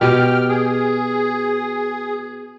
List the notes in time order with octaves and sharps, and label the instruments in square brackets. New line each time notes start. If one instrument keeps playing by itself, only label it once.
[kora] B2 G4 [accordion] G5 F6
[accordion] G#4